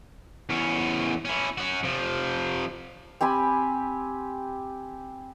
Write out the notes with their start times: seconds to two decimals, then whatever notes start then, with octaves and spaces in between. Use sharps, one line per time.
0.50 E2 C#4
1.25 C#4 E4
1.58 C#4 F#4
1.84 C3 F3
3.21 C4 G4 G#5 B5